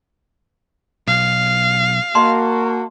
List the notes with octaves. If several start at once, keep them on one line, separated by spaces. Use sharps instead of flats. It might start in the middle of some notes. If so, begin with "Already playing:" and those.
B1 F5
A#3 F#4 D#5 A5 C6